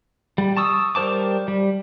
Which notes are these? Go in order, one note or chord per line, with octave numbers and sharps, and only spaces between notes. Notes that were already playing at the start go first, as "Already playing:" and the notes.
G3
A5 C#6 D#6 E6
G3 A#4 C5 A5 D6
G3